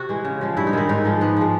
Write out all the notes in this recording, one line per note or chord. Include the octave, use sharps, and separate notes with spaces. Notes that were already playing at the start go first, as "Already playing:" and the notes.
Already playing: C3 F#4
E3 G#3
C#3
F3 G#3
G2 E4
D#4
D#3 G#3 E4
G#2 D#4
F3 G#3
G#2 B3
F3 G#3